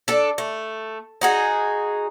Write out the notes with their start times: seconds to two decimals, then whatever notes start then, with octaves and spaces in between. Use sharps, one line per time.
0.08 D4 A4
0.38 A3
1.21 D#4 F#4 G#4